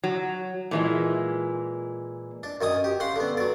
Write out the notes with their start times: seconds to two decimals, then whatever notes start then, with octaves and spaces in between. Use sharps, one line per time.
0.04 F#3
0.71 A#2 E3 G#3
2.43 D4
2.61 F#2 D#3 G#5 D#6
2.84 G4
3.00 C#3 F#5 C6
3.16 D3 B3
3.37 F#3 D5